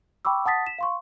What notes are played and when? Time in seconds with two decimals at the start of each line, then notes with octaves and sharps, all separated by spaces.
0.25 G5 B5 C#6 D6 E6
0.46 F#5 A5 D#6 A6 B6
0.66 B6 E7
0.79 F5 C6 C#6